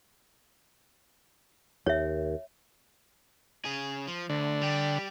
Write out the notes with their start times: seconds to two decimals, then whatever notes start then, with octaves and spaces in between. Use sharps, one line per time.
1.86 D#2 C#5 E5
3.65 C#3 G#4
4.07 F3
4.30 D2 D3
4.61 G3 G4